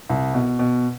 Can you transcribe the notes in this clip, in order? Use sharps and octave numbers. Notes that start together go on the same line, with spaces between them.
C2
B2
B2